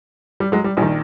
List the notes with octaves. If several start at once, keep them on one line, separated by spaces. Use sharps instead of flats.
G3
F#3 G#3
G3
A#1 D#3 G3